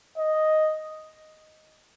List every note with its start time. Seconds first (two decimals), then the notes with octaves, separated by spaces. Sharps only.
0.18 D#5